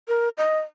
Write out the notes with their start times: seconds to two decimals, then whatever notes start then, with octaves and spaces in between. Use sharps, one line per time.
0.08 A#4
0.38 D#5